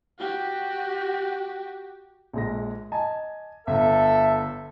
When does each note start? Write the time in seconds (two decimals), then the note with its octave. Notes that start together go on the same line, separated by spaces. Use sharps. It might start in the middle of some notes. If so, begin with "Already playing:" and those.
0.19 F#4 G4
2.33 A#1 G#3 A#6
2.92 D#5 G#5 A5
3.67 G1 A4 E5